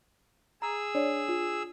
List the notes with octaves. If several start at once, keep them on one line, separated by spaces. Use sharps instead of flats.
G#4 A#5 E6
D4 C#5 D5
F4